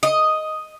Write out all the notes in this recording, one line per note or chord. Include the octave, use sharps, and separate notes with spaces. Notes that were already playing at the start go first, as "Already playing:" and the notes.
D#5